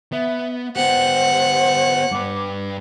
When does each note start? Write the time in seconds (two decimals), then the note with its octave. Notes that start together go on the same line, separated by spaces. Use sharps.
0.13 B3 E5
0.76 B3 G4 C5 F#5
2.11 G2 B4 D6